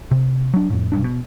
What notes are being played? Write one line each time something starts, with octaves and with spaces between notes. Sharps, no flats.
C3
F#3 D4
F2 A2
F1 B1 G2 D4
B2